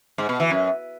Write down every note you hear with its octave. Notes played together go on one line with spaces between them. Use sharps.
G#2
B2
E3
F#2